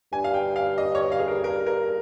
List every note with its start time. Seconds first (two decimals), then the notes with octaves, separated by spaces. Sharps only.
0.12 G2 G#5
0.24 F5
0.34 G5
0.56 F5
0.78 D#5
0.95 C#5
1.12 F5
1.20 G#4
1.28 A#4
1.44 A#4
1.66 A#4